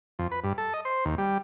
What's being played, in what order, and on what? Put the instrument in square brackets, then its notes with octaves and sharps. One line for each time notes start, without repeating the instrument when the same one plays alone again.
[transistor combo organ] F2
B4
G2
A4
D#5
C5
D#2
G3